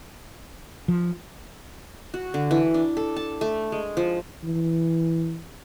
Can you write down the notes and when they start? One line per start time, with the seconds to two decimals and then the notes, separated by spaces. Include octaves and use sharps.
0.88 F3
2.14 F#4
2.34 D3
2.51 E3
2.74 D4
2.97 A4
3.16 A5
3.41 A3
3.72 G#3
3.97 F3
4.43 E3